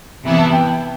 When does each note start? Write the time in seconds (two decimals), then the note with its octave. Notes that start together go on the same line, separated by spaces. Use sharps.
0.23 C3 E3 B3 E4
0.37 A5
0.52 G5